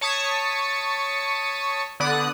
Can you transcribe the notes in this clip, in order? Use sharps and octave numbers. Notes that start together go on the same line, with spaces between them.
C#5 A5 C#6 D#6 B6 C#7
D3 B3 D5 D#6 F#6